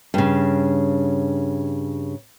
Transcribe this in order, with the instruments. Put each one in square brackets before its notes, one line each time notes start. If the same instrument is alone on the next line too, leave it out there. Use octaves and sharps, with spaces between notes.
[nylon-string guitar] G2 C#3